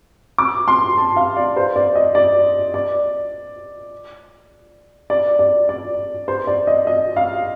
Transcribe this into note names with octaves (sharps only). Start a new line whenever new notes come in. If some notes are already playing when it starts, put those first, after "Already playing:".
D6
C6
A5
F5
D5
C5
D5
D#5
D5
D5
D5
D5
D5
C5
D5
D#5
D#5
F5